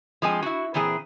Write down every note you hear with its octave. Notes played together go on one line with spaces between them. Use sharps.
F3 G#3 C4 G#5
E4 F#4
A#2 E3 C4 G#4